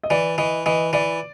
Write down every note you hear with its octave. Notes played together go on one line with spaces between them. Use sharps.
D#5
E3 D5
E3 D#5
E3 D#5
E3 D5